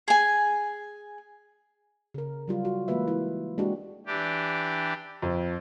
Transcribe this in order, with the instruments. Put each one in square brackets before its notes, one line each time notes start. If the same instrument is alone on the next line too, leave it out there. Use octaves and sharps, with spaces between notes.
[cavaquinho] G#4 G#5
[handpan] C#3 A#4
F#3 G3 F4
F#4
E3 G#3 A#3 F4 B4 E5
E4
G#3 A#3 D4 F#4 G4
[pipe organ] E3 D4 G4
[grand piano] F2